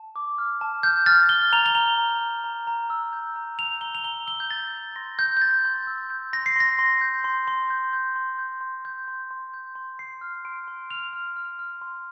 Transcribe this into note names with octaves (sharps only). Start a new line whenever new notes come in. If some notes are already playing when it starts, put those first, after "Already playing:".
Already playing: A5
D6
F6
A5
F6 G6
F6 A6
F6 G7
A#5 F7
G7
A#5 F7
A#5
A#5
A#5
A#5
E6
G6
A#5
G6 F7
A#5 G7
F7
A#5 G7
E6 G7
G6
G6 A6
G6
C6 A#6
G6
G6
C6 A6
C6
E6
G6
C6 A#6
C7
C6 A#6
C6
G6
C6
C6
G6
G6
C6
G6
C6
G6
C6
C6
G6
C6
C6 C7
F6
C6 D7
C6
F6 F7
F6
F6
F6
C6